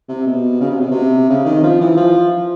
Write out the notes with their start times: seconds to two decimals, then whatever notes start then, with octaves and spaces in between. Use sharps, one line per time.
0.08 C3
0.26 B2
0.60 C#3
0.70 C3
0.81 B2
0.91 C3
1.29 C#3
1.45 D#3
1.63 F3
1.81 E3
1.97 F3